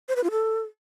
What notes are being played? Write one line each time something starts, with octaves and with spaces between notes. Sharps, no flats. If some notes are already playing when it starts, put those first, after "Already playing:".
C5
B4
F4
A4